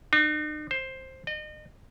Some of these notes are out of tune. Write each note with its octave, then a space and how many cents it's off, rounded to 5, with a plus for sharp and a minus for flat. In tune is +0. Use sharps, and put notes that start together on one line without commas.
D#4 -45
C5 +10
D#5 -35